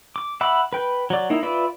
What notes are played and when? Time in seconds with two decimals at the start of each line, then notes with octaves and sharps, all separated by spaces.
0.16 D6
0.41 E5 F#5 B5 D6
0.73 B4 G5
1.10 F#3 D5
1.30 A#3 D#4 E4
1.43 F4 B4 D5 E5